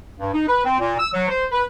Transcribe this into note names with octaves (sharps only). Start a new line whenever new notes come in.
G2
D#4
B4
C4
A#2
E6
F#3
C5
B4